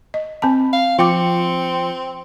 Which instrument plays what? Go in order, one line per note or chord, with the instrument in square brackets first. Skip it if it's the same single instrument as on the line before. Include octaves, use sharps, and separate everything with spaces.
[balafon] D#5
[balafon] C4 A5 [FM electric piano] B5
[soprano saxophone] F5
[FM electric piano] F3 C#7 [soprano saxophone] C4 [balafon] F4 G5 D6